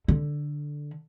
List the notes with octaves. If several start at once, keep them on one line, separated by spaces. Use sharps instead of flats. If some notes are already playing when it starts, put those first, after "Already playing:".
D3